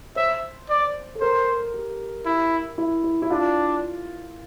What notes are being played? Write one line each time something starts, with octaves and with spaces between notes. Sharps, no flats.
C5 E5
D5
A4
A#4 C5
G4
E4
E4
E4
E4
D4 F4